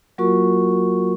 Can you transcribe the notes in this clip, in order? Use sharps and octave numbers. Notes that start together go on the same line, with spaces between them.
F#3 A#3 F4 F#4 A#4 C#6